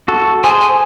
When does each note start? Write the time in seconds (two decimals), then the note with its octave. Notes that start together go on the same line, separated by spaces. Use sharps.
0.08 F#4 A4
0.44 G#4 C5 G#5
0.61 G#5